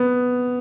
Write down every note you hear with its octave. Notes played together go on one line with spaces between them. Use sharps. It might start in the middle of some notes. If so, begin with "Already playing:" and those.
Already playing: B3